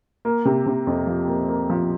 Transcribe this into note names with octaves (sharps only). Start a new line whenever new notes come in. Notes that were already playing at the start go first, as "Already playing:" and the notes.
A#3
C3
C3
F2
F3
A#3
A#3
F3